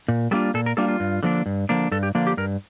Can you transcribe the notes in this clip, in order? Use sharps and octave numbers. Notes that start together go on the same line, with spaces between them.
A#2
G3 A#3 D4 F4 A4
A#2 A4
A#4
G3 A#3 D4 F4 A4
F4
G2
D3 F3 A#3 D4
G2
D3 F3 A#3 D4
G2 A4
G4
D3 F3 A#3 D4
G4
G2 A#4